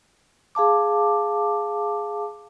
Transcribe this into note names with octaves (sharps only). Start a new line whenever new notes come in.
G#4 F5 A5 D6